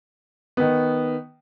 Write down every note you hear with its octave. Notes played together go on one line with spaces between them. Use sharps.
D#3 B3